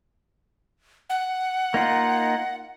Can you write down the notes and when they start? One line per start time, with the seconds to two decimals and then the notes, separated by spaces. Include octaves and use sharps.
1.10 F#5
1.74 A#3 D#4 F4